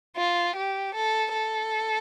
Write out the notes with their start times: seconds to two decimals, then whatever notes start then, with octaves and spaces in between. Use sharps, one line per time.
0.17 F4
0.56 G4
0.94 A4
1.33 A4